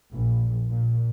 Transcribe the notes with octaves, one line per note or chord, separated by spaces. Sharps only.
A#1
A#2